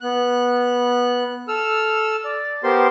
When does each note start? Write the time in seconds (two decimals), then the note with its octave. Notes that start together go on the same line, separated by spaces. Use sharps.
0.01 B3 F#6
1.48 A4 E6 F6
2.25 D5
2.64 B3 G4 A#4 C5 C6